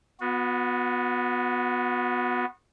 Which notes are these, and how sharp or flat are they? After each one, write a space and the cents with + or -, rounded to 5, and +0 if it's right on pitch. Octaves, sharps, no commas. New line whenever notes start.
B3 +0 F#4 -35